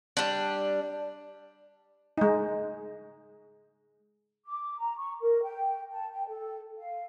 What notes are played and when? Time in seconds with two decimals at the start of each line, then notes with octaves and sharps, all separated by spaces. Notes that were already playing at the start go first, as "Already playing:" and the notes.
0.17 G3 D4
2.18 G#3 D#4
4.46 D6
4.79 A#5
4.99 C#6
5.21 A#4
5.44 G5
5.92 A5
6.13 G5
6.28 A4
6.78 F5